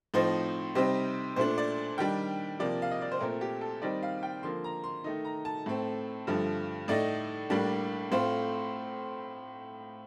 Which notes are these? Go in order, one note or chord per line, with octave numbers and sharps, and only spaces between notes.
A2 F3 C4 D#4 C5
C3 G3 C4 D#4 C5
A#2 A3 D4 C5
D5
D#3 G3 D4 G5
C3 F3 A#3 D5
F5
D#5
D5
C5
A#2 A3 C4 A#4
G4
A4
D#3 G3 C4 D#4 D5
F5
G5
D3 F3 A#3 C6
A#5
C6
D#3 A3 D#4
A#5
A5
A2 A3 C4
G2 D3 F3 A3
A2 A3 D#4 D5
A2 G3 A#3 D4
A2 A3 C4 F4 C5